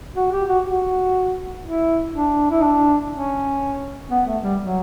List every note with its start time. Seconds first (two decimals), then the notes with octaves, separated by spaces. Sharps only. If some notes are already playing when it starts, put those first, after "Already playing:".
0.16 F#4
0.32 G4
0.48 F#4
0.65 F#4
1.64 E4
2.13 D4
2.51 E4
2.62 D4
3.12 C#4
4.10 B3
4.26 A3
4.43 G3
4.60 F#3